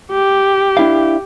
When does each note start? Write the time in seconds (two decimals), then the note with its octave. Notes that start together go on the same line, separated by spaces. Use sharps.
0.12 G4
0.77 D4 E4 F5